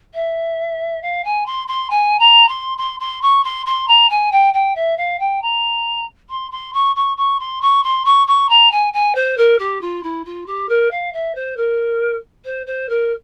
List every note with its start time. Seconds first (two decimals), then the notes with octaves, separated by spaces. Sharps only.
0.14 E5
1.02 F5
1.24 G#5
1.46 C6
1.67 C6
1.90 G#5
2.19 A#5
2.48 C6
2.77 C6
2.99 C6
3.21 C#6
3.43 C6
3.65 C6
3.87 A#5
4.09 G#5
4.31 G5
4.53 G5
4.75 E5
4.97 F5
5.19 G5
5.41 A#5
6.29 C6
6.51 C6
6.73 C#6
6.95 C#6
7.17 C#6
7.39 C6
7.61 C#6
7.83 C6
8.04 C#6
8.27 C#6
8.49 A#5
8.71 G#5
8.93 G#5
9.15 C5
9.37 A#4
9.58 G4
9.81 F4
10.03 E4
10.25 F4
10.46 G4
10.68 A#4
10.91 F5
11.12 E5
11.35 C5
11.56 A#4
12.45 C5
12.66 C5
12.89 A#4